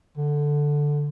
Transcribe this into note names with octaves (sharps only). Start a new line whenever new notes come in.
D3